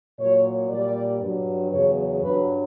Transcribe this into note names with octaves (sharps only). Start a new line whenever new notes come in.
A#2 F#3 C#5
A#2 G3 D5
G2 F#3
E2 C#3 F#3 C#5
G2 F#3 B4